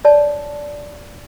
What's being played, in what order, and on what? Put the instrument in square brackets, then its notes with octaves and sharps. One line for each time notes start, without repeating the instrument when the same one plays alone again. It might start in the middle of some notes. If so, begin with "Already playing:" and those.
[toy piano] C#5 D5 A5